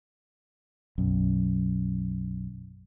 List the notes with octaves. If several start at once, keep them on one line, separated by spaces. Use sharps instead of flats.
B1 F#2